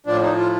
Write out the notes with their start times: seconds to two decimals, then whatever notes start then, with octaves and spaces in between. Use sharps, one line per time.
0.07 A2 F3 D4
0.22 D#4
0.37 F4